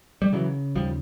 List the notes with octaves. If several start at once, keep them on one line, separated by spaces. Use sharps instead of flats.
G3
C#3 E3 F#3
D#2 F3 G3